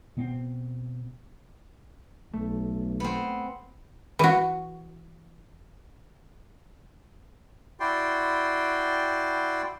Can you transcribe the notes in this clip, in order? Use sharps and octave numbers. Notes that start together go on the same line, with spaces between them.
B2 B3 C4
B1 A3
B3 C4
E3 F#4
E4 F#4 D5 G5 C6